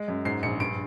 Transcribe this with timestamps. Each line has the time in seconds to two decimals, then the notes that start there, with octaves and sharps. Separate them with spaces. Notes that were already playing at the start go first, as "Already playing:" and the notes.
Already playing: G#3
0.08 F#2
0.25 G#2 C7
0.43 A#1 C#7
0.60 G2 D7